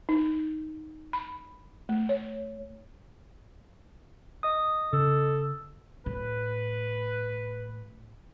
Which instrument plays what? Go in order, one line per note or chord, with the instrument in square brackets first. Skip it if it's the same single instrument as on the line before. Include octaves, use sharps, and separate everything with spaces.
[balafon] D#4
B5
A3
C#5
[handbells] D#5 D#6
[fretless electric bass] C#3 [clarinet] A4
[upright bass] A2 [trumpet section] B4